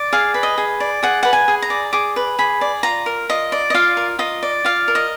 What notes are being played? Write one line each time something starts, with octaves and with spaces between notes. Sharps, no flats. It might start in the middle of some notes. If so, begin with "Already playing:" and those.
Already playing: D5
G#4 F5
B4
D#5
G#4
D5
G#4 F#5
B4 F#5
G#5
G#4
A#5
D5
G#4 D6
B4
G#4 B5
D5
F4 A#5
A#4
F4 D#5
D5
D#5
F4 F5
A#4
F4 D#5
D5
F4 F5
A#4
D#5